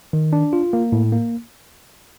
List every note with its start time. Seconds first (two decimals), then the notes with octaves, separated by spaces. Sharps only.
0.13 D#3
0.33 D4
0.53 F4
0.73 A#3
0.92 A2
1.12 A#3